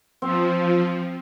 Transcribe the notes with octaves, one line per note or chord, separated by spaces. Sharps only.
F3 C4